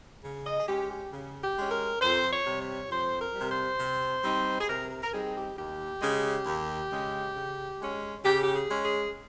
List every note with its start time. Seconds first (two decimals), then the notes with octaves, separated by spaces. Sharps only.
0.23 C#3
0.45 D#5
0.60 G#4
0.67 G#3 C#4 G4
0.90 G4
1.12 C#3
1.42 G4
1.57 G#3 C#4
1.71 A#4
2.01 F2 C5
2.31 C#5
2.46 C3 G3
2.60 C#5
2.90 F2 C5
3.20 A#4
3.34 C3 G3
3.49 C5
3.79 C3
4.24 G3 C4 D#4
4.60 G#4
4.68 C3 A#4
4.91 A#4
5.03 A#4
5.13 G3 C4 D#4 G#4
5.35 G4
5.57 D#2 G4
6.02 C#3 G#3
6.46 D#2
6.91 C#3 G#3
7.35 C#3
7.80 G#3 C#4
8.24 C#3 G4
8.42 G4
8.54 G#4
8.70 G#3 C#4
8.84 G#4